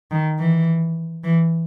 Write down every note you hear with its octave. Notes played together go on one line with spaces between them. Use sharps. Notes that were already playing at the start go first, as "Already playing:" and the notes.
D#3
E3
E3